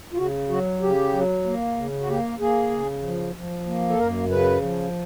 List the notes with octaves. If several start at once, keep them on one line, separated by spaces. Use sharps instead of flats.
F4
C#3 F#4
F#3 F#4
C#3 G4
F#3
A#3
C#3
F#4
A#3 G4
A#3 G#4
C#3
F3
F3
A#3
A4
F#2 A#4
C#3 B4
F3